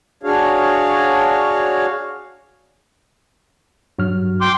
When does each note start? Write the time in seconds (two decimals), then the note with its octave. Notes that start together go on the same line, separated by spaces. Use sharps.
0.23 D4 F#4 G#4 C#5 F5
3.99 G2 F#3 F6
4.41 G5 C6 D6